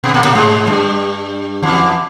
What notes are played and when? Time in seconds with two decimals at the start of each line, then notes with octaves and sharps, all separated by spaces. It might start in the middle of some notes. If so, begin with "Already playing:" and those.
0.04 B2 B3
0.14 A#2 A#3
0.24 A#2 A#3
0.35 G#2 G#3
0.67 G2 G3
1.63 E2 E3